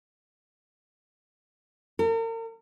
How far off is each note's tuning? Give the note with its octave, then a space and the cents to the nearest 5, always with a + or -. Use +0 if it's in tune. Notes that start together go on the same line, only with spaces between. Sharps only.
A#4 -40